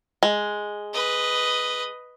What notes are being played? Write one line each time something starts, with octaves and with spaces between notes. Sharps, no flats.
G#3
B4 D#5